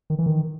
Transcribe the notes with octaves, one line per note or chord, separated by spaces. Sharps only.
D#3
E3
D#3